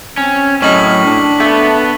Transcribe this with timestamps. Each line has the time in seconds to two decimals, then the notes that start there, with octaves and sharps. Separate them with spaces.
0.17 C4 C#4
0.62 A2 F#3 C#4 D#4 A#4 C#6 B6 F#7
1.05 D4
1.40 A3 B3 A5